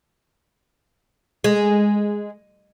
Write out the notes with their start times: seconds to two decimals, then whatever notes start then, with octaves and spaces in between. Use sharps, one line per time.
1.44 G#3